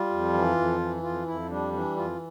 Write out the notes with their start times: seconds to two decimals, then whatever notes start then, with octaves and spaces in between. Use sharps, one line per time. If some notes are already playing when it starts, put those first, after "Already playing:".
Already playing: G3 F4
0.10 F2
0.33 E3
0.56 F2
0.80 E3
1.03 F2 F4
1.26 F2 E4
1.49 G3 D4
1.73 E3 D4
1.96 F2 F4